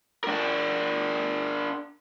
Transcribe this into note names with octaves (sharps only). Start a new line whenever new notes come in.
D4 A#4